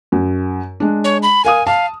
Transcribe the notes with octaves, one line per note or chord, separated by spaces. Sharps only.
F#2
G#3 D4
C#5
B5
A#4 F5 G#5 D#6
F5 A5